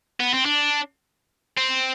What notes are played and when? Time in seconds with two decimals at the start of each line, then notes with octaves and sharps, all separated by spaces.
0.20 B3
0.33 C4
0.46 D4
1.57 C4